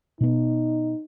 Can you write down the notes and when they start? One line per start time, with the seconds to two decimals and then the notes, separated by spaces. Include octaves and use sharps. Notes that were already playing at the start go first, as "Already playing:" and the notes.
0.21 B2 B3 D#4